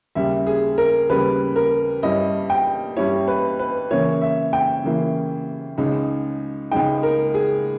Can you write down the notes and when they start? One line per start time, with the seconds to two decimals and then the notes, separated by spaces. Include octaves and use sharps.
0.15 D#2 C#3 G3 E5
0.47 G#4
0.78 A#4
1.09 D#2 C#3 G3 B4
1.56 A#4
2.03 G2 G3 C#4 E4 D#5
2.50 G5
2.96 G2 G3 C#4 E4 C#5
3.28 B4
3.59 B4
3.90 C#3 E3 A#3 E4 C#5
4.22 E5
4.53 G5
4.84 C#3 E3 A#3 E4
5.78 C#2 C#3 G#3 D#4
6.71 C#2 C#3 G#3 D#4 G5
7.03 A#4
7.34 G#4